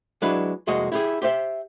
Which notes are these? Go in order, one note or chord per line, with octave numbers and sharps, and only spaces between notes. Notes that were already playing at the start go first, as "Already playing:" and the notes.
F#3 G#3 D4 E4 B4
C2 F2 G#3 A#3 F#4 D#5
E4 G4 G#4
G4 C5 E5